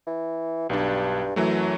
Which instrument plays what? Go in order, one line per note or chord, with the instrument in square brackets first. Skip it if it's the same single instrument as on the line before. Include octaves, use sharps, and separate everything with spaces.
[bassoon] E3
[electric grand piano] B1 D4 [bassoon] G2
[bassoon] F#2 [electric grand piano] E3 F#3 A3